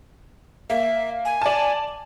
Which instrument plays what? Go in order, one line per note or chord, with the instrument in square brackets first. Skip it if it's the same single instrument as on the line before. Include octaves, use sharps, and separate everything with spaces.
[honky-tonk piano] A#3 [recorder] E5
[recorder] G#5
[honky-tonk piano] D5 A5